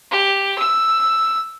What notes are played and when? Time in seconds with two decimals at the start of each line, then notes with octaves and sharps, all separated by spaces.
0.11 G4
0.58 E6